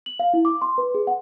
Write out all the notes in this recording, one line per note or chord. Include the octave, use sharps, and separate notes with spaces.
F#7
F5
E4
D6
C6
B4
G#4
F#5